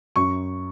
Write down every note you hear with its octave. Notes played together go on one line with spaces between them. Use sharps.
F#2 C#6